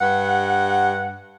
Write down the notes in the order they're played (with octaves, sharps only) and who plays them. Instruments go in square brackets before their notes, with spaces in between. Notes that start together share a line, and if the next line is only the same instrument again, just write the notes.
[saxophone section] G2 F#5